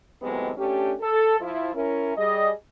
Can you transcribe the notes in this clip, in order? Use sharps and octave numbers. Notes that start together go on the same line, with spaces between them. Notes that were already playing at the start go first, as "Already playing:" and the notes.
A2 C3 D#3 F#3 G#3 B3
A3 C#4 D4 G4
A4
F3 E4 F4
C#4 E4 A#4
G3 G#4 D#5